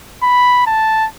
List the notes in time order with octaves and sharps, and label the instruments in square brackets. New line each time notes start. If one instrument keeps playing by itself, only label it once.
[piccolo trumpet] B5
A5